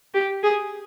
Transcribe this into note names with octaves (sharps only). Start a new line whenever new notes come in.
G4
G#4